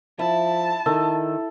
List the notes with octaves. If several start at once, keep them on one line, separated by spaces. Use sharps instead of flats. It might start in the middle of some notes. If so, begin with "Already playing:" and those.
F3 E4 A5
D#3 E4 A4